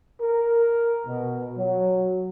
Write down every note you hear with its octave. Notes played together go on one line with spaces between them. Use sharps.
A#4
B2
F#3